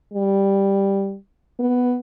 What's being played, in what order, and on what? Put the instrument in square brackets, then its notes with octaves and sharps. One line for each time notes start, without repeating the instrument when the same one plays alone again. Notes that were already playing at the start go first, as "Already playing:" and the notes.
[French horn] G3
B3